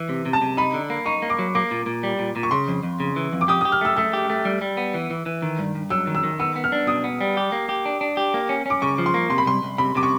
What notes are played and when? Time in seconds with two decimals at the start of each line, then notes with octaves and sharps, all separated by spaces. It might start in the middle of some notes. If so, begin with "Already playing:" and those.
Already playing: E3
0.09 C3
0.26 C3
0.33 A5
0.42 C3
0.57 D#4 B5
0.74 D3
0.90 A#3
1.06 D#4 C#6
1.22 A#3
1.30 D6
1.39 F#3
1.55 A#3 D6
1.71 A#2
1.86 A#2
2.03 G3
2.19 A#2
2.36 A#2
2.43 C#6
2.51 C#3 C6
2.68 F2
2.83 F2
3.00 C#3
3.16 E3
3.33 F2
3.41 D6
3.48 G4 D#6
3.61 G4 D#6
3.72 F6
3.81 A3 E6
3.96 A3 E6
4.13 G4
4.30 A3
4.45 G3
4.61 G3
4.77 B3
4.94 E3
5.10 E3
5.26 E3
5.42 D#3
5.59 G2
5.75 G2
5.90 F#3 E6
6.07 D#3
6.15 E6
6.24 D#3
6.39 B3 E6
6.56 B3
6.64 F6
6.72 D4
6.87 B2 D#6
7.04 B3
7.21 G3
7.37 G4
7.52 A#3
7.69 G4
7.86 D4
8.01 D4
8.17 G4
8.34 A#3
8.49 C#4
8.66 C#4 D6
8.82 C#3 C#6
8.98 F3
9.06 C6
9.14 A#3
9.30 C3 C6
9.38 B5
9.46 C2 C6
9.63 C2
9.78 C3 B5
9.95 C3 D6
10.03 C#6